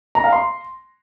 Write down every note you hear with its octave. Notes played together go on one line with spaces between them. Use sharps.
A#5
F5
C6